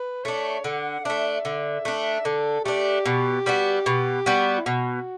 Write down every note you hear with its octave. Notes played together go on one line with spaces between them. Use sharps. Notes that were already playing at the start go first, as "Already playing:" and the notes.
Already playing: B4
A3 D4 C#5
D3 F#5
A3 D4 E5
D3
A3 D4
D3 A4
A3 D4 G4
B2
G3 B3 F#4
B2
G3 B3 F#4
E4
B2 F#4